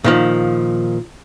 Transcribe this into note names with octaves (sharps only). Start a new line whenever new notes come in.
A#2 D#3 F3